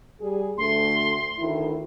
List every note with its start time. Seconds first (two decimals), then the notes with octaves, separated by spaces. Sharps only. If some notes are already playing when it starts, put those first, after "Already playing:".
0.20 G3 G#4
0.58 D2 A3 C6
1.38 D2 D#3 E4